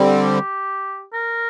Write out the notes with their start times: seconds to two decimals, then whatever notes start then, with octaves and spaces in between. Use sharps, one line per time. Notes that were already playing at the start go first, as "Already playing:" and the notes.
Already playing: D3 G3 C4
0.19 G4
1.13 A#4